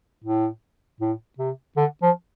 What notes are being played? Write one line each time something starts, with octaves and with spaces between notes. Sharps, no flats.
A2
A2
C3
D3
F3